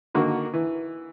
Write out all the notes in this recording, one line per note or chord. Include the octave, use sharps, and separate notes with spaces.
D3 D#3 A#3 F#4
E3